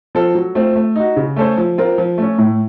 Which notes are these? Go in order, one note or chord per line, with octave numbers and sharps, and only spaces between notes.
F3 C4 F4 A4
F#3
A3 C4 F4
A3
D#4 F#4
C#3
A3 C#4 A4 C5
F3
C4 F4 A#4
F3
A3 C#4
A2